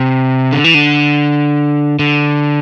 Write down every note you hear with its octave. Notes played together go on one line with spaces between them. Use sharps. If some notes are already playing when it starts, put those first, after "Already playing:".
Already playing: C3
D3
E3
D3
D3